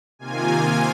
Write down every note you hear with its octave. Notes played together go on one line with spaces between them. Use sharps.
C3 D#3 A#3 F4 G#5